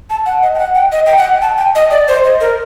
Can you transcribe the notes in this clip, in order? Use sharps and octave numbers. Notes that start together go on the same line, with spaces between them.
A5
F#5
D#5
G5
F#5
G5
D#5
G5
F#5
A5
G5
D#5
D5
C5
D#5
A#4